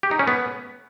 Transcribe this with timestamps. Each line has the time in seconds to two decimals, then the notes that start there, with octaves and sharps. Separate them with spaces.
0.03 G4
0.11 D#4
0.19 C#4
0.28 B3